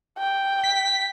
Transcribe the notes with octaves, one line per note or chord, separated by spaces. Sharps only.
G5
B6